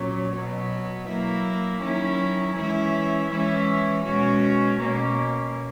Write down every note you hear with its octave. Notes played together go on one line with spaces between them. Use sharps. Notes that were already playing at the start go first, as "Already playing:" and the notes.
Already playing: A#2 F#3 C#4
B2 F#3 B3
F#3 A#3 E4
D#3 F#3 C#4 E4
E3 G#3 C#4 E4
E3 G#3 C#4 E4
B2 G#3 C#4 F#4
B2 A#3 C#4